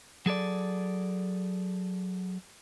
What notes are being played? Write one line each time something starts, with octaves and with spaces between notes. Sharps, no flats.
F#3 G#4 A4 D5